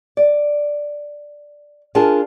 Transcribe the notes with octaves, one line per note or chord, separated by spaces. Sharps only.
D5
D4 F4 G#4 A#4 A5